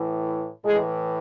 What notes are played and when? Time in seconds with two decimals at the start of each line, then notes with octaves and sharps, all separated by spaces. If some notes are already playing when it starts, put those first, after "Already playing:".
Already playing: A2 E3
0.65 A2 E3 G#3 G#4